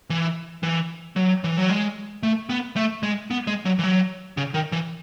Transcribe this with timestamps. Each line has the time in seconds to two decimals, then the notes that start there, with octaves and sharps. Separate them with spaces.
0.10 E3
0.63 E3
1.16 F#3
1.44 E3
1.58 F#3
1.70 G#3
2.23 A3
2.49 B3
2.76 A3
3.03 G#3
3.31 B3
3.47 G#3
3.65 F#3
3.79 E3
3.84 F#3
4.37 C#3
4.54 D#3
4.72 E3